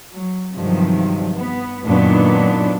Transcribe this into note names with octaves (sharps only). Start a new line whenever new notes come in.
F#3
G2 C3 D#3 F3 F#3
B3
F#2 A#2 D#3 F#3 B3 D4